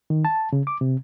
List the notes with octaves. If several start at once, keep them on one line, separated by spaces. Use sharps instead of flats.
D#3
A5
C#3
D6
C3